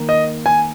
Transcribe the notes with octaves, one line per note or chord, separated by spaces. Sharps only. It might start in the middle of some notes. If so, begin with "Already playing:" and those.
Already playing: D#3 A#3
D#5
G#5